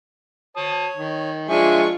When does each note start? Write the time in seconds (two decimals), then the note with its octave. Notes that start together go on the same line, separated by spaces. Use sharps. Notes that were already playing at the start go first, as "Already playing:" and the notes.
0.57 C#5 A5 D#6
0.96 D#3
1.49 F3 G#3 D4 F4 E5 G#5 C#6